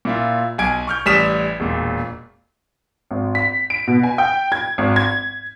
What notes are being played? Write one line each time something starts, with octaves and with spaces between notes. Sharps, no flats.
A#2 E4 F4
B1 G#5 G#6 D7
C#6 F6 G6
A1 G3 D#6 F6 B6 E7
E1 A#2
G#1
B6
D7
B2
G#5
G5
G#6
G#1
G#6